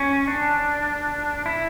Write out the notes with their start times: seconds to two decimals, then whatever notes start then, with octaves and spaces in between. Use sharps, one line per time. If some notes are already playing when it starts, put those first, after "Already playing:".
Already playing: C#4
0.27 D4
1.46 E4